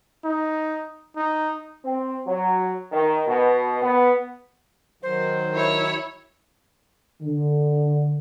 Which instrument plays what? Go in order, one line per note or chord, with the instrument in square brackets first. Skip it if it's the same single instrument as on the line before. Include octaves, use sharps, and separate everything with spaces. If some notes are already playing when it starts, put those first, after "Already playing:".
[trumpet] D#4
D#4
[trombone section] C4
F#3
D#3
B2
B3
[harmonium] D#3 F#3 [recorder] C5
[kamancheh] E4 C#5
[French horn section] D3